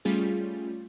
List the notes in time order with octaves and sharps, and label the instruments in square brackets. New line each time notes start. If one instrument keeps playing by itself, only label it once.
[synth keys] G3 A3 C#4 F4 G#4